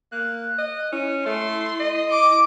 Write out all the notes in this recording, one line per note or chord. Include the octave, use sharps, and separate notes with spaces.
A#3 F#6
D#5
C#4 E4
A3 C6
D#5
D6